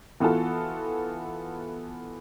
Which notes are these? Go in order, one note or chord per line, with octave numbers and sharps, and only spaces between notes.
E3 B3 F4 F#4 A4